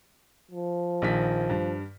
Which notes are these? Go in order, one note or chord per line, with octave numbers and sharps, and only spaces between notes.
F3
A#1 D#3 B6
G2